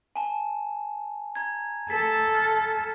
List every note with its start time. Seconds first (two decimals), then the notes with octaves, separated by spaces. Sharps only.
0.16 G#5 A5
1.35 A#5 G#6
1.90 A4 B6
2.35 F6